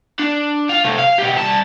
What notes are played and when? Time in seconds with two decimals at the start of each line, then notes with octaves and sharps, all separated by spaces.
0.19 D4
0.69 F4
0.85 C3 A3
0.98 F5
1.18 B2 G4
1.37 C2 A5